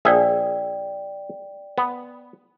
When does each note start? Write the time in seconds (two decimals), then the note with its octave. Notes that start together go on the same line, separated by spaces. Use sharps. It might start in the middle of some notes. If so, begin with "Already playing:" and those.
0.05 A#1 G#4 D5 E5 G5
1.78 B3